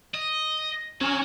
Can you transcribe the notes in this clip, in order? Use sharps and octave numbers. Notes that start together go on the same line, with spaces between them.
D#5
F#3 C#4 F#4